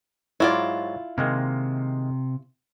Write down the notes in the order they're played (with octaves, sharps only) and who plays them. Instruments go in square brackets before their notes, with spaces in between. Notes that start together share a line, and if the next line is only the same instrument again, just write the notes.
[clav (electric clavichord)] G#2 F#3 [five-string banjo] E4 F4 D5
[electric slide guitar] C3 [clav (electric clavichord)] D#3 G#3 A#3